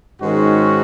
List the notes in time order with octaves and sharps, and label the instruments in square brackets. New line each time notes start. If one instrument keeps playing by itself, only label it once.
[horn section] G#2 D#3 G#3 C#4 F#4